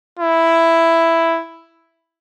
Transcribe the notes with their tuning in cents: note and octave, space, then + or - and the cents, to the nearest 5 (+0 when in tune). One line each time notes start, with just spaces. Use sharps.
E4 +5